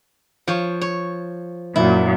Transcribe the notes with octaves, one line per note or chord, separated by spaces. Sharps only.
F3 C#5
C#5
F#2 A#2 F#3 E4